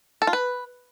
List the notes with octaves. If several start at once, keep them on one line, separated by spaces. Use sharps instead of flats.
A4
F4
B4